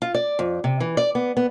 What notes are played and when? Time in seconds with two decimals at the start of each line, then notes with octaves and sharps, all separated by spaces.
0.02 F4
0.14 D5
0.39 F2
0.64 C3
0.80 E3
0.97 D5
1.15 B3
1.37 B3